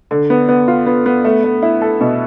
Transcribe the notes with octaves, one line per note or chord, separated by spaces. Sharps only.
D3
B3
B3
F4
B3
B3
A3
A3
E4
A4
B2